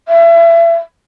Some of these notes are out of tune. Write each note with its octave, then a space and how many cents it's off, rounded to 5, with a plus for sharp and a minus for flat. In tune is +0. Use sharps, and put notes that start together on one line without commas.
E5 +30